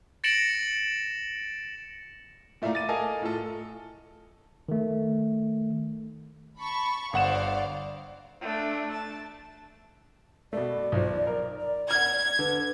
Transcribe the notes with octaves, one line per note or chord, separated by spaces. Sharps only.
A6 A#6 C#7 D7 E7 F#7
A#2 A3 E4 D5 F5 A#5
D6 A6 D#7
A4 A#4 D#5 F5 G#5 A5
A2 F4 A4
D#3 A3
A5 B5 C#6
G1 C5 D5 F5 F#5 E7
A3 D4
A5
B2 A3 D5
B1 F3
A#4
D5
F#5 F6 G#6
D3 B4